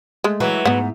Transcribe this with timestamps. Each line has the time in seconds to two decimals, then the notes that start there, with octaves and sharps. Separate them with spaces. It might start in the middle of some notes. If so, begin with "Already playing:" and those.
0.24 G#3 A3
0.40 E3 F#3 B4
0.65 G#2 B3 F#5